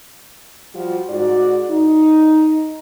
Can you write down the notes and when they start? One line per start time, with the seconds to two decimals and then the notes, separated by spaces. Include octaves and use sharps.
0.75 F3 G3 F4 F#4
1.10 G#2 F#4 D5
1.70 D#4